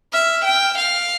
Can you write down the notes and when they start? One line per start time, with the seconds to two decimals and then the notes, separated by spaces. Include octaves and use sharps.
0.13 E5 F6
0.45 G5
0.78 F5